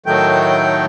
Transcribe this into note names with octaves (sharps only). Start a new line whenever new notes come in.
A2 D#3 F#3 A3 G5